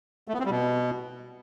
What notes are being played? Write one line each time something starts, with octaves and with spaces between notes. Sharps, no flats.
A3
B3
C4
G3
B2